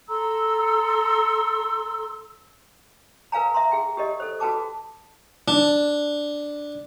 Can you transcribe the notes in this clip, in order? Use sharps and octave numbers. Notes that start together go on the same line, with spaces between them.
A4 A#5 C6 E6
A#4 B4 F5 G#5 A#5
E5 A#5 C6
G#4 G5
G4 A#4 D#5
A4 C5
F#4 A4 B4 G5 A5 D6
D4